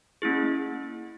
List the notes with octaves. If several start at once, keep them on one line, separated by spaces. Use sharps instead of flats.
A#3 C#4 E4 G#4